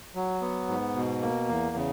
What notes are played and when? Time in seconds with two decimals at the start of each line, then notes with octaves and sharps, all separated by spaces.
0.15 F#3
0.41 B3
0.68 G#2
0.95 B2
1.22 A#3
1.49 E2
1.76 C#3